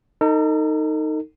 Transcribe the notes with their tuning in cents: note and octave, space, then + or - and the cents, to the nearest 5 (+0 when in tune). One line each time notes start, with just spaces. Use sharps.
D#4 +0 A4 +45